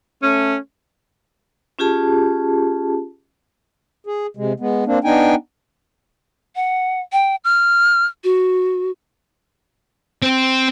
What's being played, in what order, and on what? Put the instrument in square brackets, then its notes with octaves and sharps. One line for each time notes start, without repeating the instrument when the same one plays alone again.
[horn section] A3 C#4
[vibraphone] C#4 F4 G4 G#4 A5
[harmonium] G#4
C3 G#3
G#3 B3
A#3 C4 D4
B3 D4 D#4 G5 G#5
[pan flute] F#5
G5
F6
F#4
[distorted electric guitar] C4